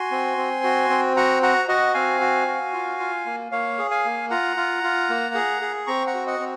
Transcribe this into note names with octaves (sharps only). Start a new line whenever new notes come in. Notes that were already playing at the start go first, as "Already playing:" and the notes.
Already playing: F#4 G#5 C6
C4
C4
F#4
C4
F#4 F#5 A#5
F#4 F#5 A#5
F#4 D#5 F#5
C4 F5 G#5
F#4
F#4
F4
F4
A#3
A#3 C#5 F5
G#4
F5 G#5
A#3
F4 F#5 A#5
F4
F4
A#3
G#4
G#4
C4 A#5 C#6
F#5 A#5
F#4
D#5 F#5
C4